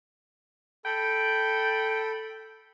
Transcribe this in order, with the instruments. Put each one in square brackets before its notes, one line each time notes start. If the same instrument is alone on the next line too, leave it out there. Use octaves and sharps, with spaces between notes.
[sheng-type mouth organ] A4 B5 [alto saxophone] G5